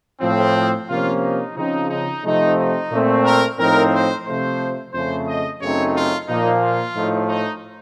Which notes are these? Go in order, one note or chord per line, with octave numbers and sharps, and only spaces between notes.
A2 F3 C4
C3 F3 A#3 C#4 F4
D#4
C#3 F3 C4 D#4
D#4
C3 F3 A3 C4 D#4
D#4
A#2 A3 C4
A#4
A2 F3 C4 D#4 A#4
C5
C3 F3 A3 C5
F2 C#3 A3 C5
D#5
F#2 C#3 A3 C4 D#4 C#5
F4
A#2 F3 A#3 D#4
F4
A2 F3 A3 D#4
D#4